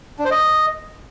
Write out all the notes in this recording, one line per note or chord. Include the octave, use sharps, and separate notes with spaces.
D4
C5
D#5